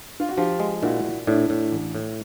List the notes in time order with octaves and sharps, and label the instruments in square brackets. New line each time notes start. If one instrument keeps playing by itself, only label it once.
[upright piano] F4
F#4
[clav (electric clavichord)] F3 [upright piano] F4 G4
[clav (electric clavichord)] G#3
[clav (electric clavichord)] A#2 [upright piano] E4 F#4
[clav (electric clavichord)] A#2
[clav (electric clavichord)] A2 [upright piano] D4 E4
[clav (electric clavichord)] A2
A1
A2